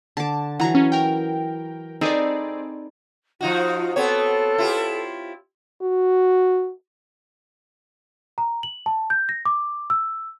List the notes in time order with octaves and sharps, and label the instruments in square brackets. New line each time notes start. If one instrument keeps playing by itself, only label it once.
[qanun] D3 D6 [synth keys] A5
[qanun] E3 F#3 [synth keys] F#5 A#5
[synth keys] C#4
A#4 G5
[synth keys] C4 G#4 D5 [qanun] D#4 A4 B4
[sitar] F3 D#4 F#4 [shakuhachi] F4
[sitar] B3 C4 C#5 [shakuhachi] A4
[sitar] E4 F4 G4
[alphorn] F#4
[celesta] A#5
F#7
A5
G6
A#6
D6
E6